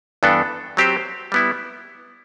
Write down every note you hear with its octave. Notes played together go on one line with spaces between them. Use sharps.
G2 E3 B3 D4 A4
F#3 C4 G4 C5
G3 B3 E4